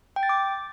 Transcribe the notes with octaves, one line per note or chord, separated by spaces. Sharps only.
G5
A6
D6